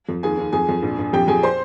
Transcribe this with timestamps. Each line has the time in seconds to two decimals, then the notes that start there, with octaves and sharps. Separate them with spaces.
0.09 F2
0.23 D#2 G#4 G#5
0.38 D#2
0.52 F2 G#4 G#5
0.69 F2
0.82 A#1
0.99 A#1
1.13 F2 G4 G5
1.28 F2 G#4 G#5
1.43 C5 C6